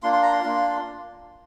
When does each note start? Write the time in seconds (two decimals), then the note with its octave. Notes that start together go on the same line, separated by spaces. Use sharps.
0.03 A#3 D4 F4 C6
0.13 C6
0.22 A#5
0.32 C6
0.42 A#3 D4 F4